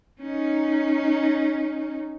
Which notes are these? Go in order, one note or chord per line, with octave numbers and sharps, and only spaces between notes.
C#4 D#4